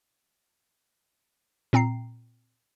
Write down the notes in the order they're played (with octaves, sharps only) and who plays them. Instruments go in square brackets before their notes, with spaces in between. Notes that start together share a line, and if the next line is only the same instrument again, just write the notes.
[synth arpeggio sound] A#2 C4 G5 A#5 C7